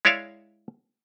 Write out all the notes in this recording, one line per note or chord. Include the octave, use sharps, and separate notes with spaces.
G#3 E4 C#5 D5 E5 F5